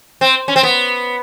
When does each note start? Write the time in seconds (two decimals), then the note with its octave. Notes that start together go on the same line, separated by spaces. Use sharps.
0.21 C4
0.48 C#4
0.56 C4
0.63 B3